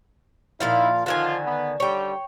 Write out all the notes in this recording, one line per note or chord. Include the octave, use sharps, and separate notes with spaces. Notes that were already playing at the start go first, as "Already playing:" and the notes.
A#2 F3 A#3 D#4 E4 F5
D3 D#3 F3 D#4 F4 G#5
B3
D3 D#3 G3 C#5 G5